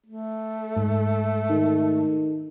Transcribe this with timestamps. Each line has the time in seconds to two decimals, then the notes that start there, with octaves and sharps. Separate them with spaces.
0.06 A3
0.76 G#2
1.50 D#3